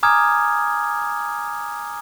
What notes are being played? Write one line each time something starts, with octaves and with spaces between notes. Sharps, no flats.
G#5 A#5 D6 D#6 F6 G#6